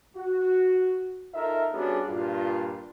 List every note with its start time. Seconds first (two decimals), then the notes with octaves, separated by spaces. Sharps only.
0.17 F#4
1.34 D#4 F4 A4 A#4 E5
1.72 G3 B3 C#4 D4 F#4 G#4
2.08 G2 A#2 F4